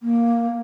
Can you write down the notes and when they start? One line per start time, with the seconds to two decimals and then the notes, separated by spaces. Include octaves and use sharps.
0.01 A#3